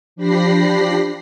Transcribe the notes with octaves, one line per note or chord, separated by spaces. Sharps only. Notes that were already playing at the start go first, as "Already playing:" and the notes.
F3 D4 G4 B5 A#6 C7